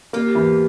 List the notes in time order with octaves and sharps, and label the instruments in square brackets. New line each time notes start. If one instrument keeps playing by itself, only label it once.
[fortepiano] A#3 [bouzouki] F4 G4
[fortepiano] E2